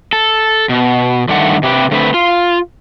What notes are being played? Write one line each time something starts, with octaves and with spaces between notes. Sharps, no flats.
A4
B2
G2 D3 D#3 A3 F#5
C3 G4 B4
D3 A3 C4 B4
F4